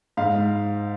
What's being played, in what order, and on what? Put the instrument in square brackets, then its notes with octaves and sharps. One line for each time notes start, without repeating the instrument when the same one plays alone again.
[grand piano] G#2 F5